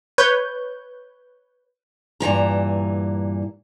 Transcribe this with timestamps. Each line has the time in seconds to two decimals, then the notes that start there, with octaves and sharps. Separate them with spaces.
0.18 B4 C#5 G6
2.20 G2 A#2 E3 A#5